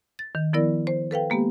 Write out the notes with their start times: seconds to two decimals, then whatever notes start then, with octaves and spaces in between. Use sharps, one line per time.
0.19 A6
0.35 D#3
0.53 F3 B3 E4 A#4 D5
0.87 C5
1.11 A4 B4 F5 G5
1.30 G#3 A#3 B3 G4